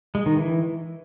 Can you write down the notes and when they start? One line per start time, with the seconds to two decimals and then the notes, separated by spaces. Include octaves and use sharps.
0.15 G#3
0.26 D#3
0.37 E3